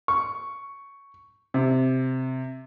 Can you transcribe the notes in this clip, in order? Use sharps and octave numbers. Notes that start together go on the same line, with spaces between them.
C#6
C3